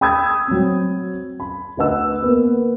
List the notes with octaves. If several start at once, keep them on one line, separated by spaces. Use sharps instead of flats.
G5 B5 D#6 E6 G#6
F#3 C4
B5
D2 B4 D#5 F#5 E6
A#3 B3 B4